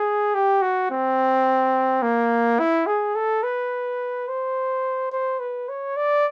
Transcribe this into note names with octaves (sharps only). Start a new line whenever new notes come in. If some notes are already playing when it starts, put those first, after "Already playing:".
Already playing: G#4
G4
F#4
C4
A#3
E4
G#4
A4
B4
C5
C5
B4
C#5
D5